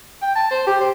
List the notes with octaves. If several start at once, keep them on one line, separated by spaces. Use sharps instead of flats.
G5
A5
C5
G4
C5